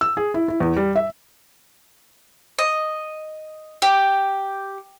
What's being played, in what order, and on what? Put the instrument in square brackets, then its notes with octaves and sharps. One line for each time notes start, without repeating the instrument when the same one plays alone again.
[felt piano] E6
G#4
E4
E4
E2
G3
E5
[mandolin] D#5
G4